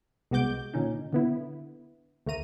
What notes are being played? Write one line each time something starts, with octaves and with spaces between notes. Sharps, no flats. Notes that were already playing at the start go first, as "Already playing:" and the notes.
C2 G#3 B3 F#4 D6 G6
A#2 D3 C#4 D#4
D3 B3 E4
D2 A3 A#3 A#5 D#7